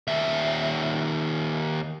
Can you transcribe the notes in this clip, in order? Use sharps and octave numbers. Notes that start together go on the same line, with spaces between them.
D#2 E5